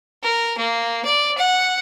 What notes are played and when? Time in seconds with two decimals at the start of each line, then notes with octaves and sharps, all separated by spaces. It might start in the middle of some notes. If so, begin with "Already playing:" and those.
0.23 A#4
0.58 A#3
1.04 D5
1.38 F#5